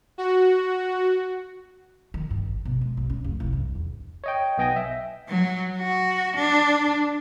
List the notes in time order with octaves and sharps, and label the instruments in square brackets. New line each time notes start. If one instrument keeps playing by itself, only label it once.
[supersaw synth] F#4
[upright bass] D#3
G2
G#1
B2
G#3
B1
C#4
F1
C2
G2
E2
[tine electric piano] C#5 D#5 G5
B1 B3 D#5 G5 G#5 A#6
E5
[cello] F#3
F#4
D4